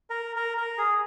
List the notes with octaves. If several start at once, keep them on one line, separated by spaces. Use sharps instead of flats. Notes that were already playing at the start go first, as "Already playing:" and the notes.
A#4
A#4
A#4
G#4